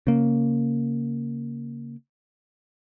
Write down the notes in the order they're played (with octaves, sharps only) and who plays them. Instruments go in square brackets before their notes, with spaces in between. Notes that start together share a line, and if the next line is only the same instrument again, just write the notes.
[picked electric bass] C#3 A#3